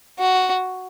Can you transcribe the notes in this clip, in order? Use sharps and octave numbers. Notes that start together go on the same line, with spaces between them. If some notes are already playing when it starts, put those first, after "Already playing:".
F#4